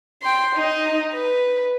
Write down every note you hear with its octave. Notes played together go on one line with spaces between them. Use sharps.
G5 C6
D#4 D#5
B4